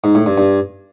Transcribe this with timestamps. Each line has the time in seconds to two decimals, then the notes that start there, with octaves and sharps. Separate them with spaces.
0.04 G#2
0.15 A2
0.26 G2
0.38 G2